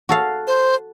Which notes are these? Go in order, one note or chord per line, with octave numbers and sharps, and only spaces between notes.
F#4 A4 F5
C5